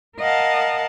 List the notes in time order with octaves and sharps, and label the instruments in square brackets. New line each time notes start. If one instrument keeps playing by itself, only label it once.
[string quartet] A#4 D#5 F5 F#5 A5